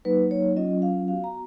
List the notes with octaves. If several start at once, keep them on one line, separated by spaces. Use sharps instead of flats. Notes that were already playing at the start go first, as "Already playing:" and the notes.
F#3 A#3 D#4 B4
C#5
F#3 C#4 F4 D#5
F5
B3 F#4 F5
A#5